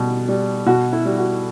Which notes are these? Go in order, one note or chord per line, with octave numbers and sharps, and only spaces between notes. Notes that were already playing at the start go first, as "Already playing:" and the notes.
Already playing: B2 G3
G3
B2 F#4
E4
G3
F#4